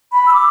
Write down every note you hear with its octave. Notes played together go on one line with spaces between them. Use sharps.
B5
E6
D6